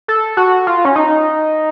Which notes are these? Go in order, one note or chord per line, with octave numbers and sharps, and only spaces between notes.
A4
F#4
F4
C#4
D#4